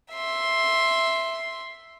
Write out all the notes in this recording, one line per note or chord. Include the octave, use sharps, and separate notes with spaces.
E5 C6